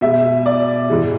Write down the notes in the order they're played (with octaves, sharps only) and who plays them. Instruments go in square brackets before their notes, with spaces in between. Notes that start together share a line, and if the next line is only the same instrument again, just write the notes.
[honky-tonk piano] B2 G#3 E5
D5
G#2 E3 G#3